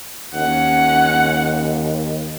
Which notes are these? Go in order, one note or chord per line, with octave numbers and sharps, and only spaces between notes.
D#2 C#4 F#5